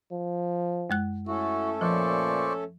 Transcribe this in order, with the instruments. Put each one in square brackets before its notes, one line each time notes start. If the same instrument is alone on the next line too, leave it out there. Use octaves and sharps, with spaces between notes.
[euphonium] F3
[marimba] F#2 G#3 F#6
[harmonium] A3 C#4 A4 [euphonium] E4 [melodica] F#4
[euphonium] A#2 [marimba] F3 [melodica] C5 D5 C#6